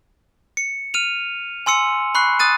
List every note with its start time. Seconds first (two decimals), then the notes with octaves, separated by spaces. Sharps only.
0.57 C#7
0.94 F6 D#7 F7
1.66 G#5 C6 E6 C#7
2.15 B5 C#6 F#6 C7
2.39 D#6 F#6 A6 D#7